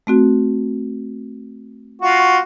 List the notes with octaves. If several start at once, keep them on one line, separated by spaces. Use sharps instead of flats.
A3 C4 F#4
F4 F#4